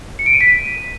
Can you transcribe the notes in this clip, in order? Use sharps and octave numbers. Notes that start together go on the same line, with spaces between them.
C#7
D7
D#7
B6
D#7